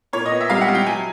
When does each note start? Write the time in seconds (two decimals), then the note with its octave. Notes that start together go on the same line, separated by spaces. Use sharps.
0.13 A#2 C#5
0.26 D#5
0.31 B3
0.41 E5
0.50 G3 F5
0.61 F#5
0.68 G3
0.75 G5
0.86 F#3 G#5